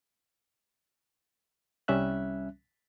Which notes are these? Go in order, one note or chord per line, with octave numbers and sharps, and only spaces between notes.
C2 G3 C#4 E5 F#6